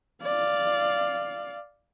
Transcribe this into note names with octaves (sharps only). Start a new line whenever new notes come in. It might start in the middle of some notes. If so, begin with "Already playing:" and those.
D5 F5